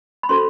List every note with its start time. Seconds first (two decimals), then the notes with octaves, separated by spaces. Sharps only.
0.23 B5
0.29 C#4 F#4 A4 C5 C6